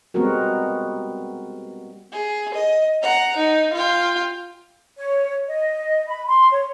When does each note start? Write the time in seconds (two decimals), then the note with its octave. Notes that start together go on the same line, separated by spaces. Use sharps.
0.14 G3 G#3 B3 C4 F#4 A#4
2.12 G#4
2.54 D#5
3.02 F#5 A#5
3.36 D#4
3.73 F4 G5
4.97 C#5
5.48 D#5
6.07 B5
6.27 C6
6.52 C#5